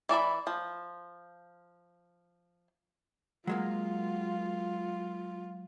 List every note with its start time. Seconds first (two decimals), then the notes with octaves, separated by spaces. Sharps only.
0.09 E3 D5 E5 B5
0.47 F3
3.47 F#3 G#3 A#3 F4